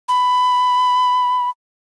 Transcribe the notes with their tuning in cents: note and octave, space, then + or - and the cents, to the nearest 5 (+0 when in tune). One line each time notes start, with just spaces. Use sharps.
B5 +15